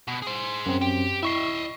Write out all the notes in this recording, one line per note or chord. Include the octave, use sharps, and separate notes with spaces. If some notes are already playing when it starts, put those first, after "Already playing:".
B2
G#4 C5
F#2 C4
G4
E4 D#5 E5 C#6 C7